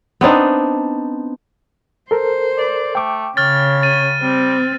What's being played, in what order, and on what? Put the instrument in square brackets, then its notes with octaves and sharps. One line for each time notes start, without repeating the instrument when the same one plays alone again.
[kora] B3 C4 D4 D#4
[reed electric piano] A4 A#4 [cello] C5
[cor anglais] D5
[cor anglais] A3 [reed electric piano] G5 D6
[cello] C#3 [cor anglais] C#5 [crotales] F6 A6
[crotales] A6 D#7
[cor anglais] G3 [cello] C4